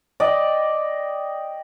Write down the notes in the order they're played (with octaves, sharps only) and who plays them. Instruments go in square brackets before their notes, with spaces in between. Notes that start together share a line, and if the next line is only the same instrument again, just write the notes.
[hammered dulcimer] D5 D#5 G5